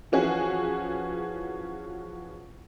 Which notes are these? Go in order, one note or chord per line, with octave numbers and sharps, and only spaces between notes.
E3 F3 C#4 F#4 G#4